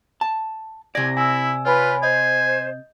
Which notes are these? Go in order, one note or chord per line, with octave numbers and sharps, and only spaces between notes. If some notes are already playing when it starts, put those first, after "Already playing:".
A5
C3 D5 G#5 A#6
E4 G#5 E6
F4 B4 C#5 G#5 B5
C5 D#5 G#5 G6